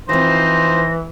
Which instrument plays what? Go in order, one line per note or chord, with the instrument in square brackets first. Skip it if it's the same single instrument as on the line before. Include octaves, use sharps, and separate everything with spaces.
[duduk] E3 [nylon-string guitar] F3 C4 [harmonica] D#4 C5 C6 [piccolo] A#6